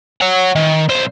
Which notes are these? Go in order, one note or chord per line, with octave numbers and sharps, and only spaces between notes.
C#5 F#5
D#3
B1 C5